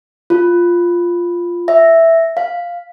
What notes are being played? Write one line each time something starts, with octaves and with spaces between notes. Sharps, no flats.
F4
E5
F5